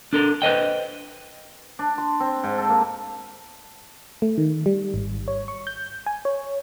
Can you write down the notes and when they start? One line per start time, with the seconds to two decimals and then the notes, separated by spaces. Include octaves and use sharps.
0.13 D4 A4 A#4
0.42 B4 C5 D#5 G5
1.79 D4
1.98 C6
2.20 C4
2.44 G#2
2.58 A4
2.70 A#3
4.22 A3
4.38 D#3
4.66 G3
4.94 G#1
5.28 C#5
5.48 C#6
5.67 G6
6.06 G#5
6.25 C#5